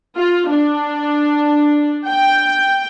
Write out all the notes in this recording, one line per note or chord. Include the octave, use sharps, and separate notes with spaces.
F4
D4
G5